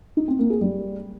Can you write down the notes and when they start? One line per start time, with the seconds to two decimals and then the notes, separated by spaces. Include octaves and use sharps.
0.17 D#4
0.28 C4
0.39 A#3
0.50 G#4
0.61 G3